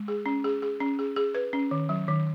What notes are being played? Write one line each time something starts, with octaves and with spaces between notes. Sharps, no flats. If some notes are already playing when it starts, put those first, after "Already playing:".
Already playing: G#3
G#4
C#4
G#4
G#4
C#4
G#4
G#4
B4
C#4
D#3
F#3
D#3